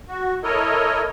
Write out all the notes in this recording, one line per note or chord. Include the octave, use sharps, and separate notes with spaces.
F#4
E4 A4 A#4 C#5 D#5